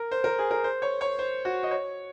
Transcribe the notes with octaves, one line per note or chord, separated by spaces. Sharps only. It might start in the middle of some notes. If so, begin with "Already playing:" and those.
Already playing: A#4
C5
A#4
G#4
A#4
C5
C#5
C#5
C5
F#4
D#5
C#5